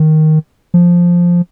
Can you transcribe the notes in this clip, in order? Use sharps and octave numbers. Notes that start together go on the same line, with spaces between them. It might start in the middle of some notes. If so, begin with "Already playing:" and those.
Already playing: D#3
F3